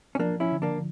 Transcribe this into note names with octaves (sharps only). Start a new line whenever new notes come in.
C#4
F3 A#3 D4
C#4 E4
D3
A#3 D4